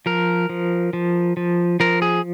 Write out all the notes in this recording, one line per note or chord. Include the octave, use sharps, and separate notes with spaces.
F3 A#4
F3
F3
F3
F3 A#4
G#4